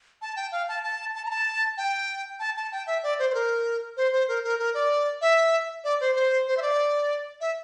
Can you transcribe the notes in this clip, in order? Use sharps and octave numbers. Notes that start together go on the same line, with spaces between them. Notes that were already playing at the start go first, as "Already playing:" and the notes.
A5
G5
F5
A5
A5
A5
A#5
A5
G5
A5
A5
G5
E5
D5
C5
C5
A#4
C5
C5
A#4
A#4
A#4
D5
E5
D5
C5
C5
C5
E5
D5
E5